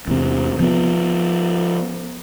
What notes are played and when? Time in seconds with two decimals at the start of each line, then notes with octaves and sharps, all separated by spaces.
0.08 E2 C3
0.60 F3 B3